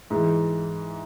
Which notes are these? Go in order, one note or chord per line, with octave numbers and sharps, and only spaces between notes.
G#2 E3